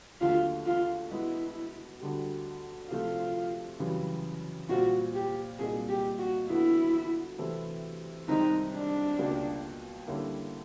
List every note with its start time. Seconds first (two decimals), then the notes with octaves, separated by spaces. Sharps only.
0.21 D#2 D3 F#3 A3 F4
0.66 F4
1.11 B2 G#3 B3 E4
2.00 D2 D3 G3
2.90 C3 F3 A3 F4
3.79 F#2 C#3 E3 G3
4.69 A#2 G3 C4 F4 F#4
5.14 G4
5.59 C2 A#2 F#3 A#3 D#4 G#4
5.89 G4
6.19 F#4
6.49 D2 D3 F#3 B3 E4
7.38 C3 E3 A3 C4 E4
8.28 C2 C3 D#3 G#3 C4 D#4
8.73 D4
9.18 C#2 B2 G3 A#3
10.07 D3 G3 A#3 C#4 E4